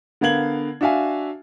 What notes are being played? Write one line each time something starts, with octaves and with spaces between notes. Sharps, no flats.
D3 B3 A#4 F5 G#6 F#7
D4 F#4 E5 F5 G#5